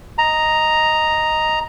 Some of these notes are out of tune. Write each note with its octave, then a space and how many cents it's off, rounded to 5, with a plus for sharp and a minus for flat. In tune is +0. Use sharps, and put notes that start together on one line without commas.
D#5 +0 A#5 +0